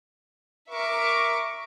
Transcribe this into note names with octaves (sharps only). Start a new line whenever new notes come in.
A#4 E5 C#6 D6